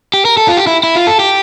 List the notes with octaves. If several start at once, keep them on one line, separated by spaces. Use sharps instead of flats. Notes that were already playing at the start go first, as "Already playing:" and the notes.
G4
A#4
A4
F4
G4
E4
E4
F4
A4
G4